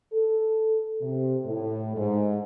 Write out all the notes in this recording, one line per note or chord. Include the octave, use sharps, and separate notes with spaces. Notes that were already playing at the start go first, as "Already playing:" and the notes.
A4
C3
A2
G#2